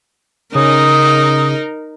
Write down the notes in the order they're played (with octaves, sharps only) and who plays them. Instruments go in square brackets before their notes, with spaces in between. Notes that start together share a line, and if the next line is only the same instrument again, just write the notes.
[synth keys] C#3 [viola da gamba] D#4 A#4 [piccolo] D#6